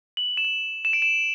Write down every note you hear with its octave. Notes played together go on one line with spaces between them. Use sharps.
F#7
E7
F#7
E7
D7
E7